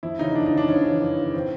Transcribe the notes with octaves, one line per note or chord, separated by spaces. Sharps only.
F2 E4
C#3 E3 D#4
F2 D4
D#4
C#3 E3
D4
F2 C#4
C#3 E3
F2
C#3 E3
A2 C4